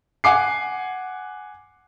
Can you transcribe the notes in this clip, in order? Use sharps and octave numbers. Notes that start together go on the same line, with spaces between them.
F#5 G#5 D6 C7